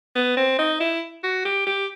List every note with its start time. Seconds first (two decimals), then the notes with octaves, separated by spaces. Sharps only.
0.16 B3
0.37 C4
0.59 D#4
0.80 E4
1.24 F#4
1.45 G4
1.67 G4